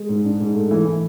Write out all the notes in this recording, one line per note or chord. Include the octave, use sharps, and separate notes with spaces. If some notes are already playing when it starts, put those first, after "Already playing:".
Already playing: G#3
G#2
D4
G#2
A3
E3
E3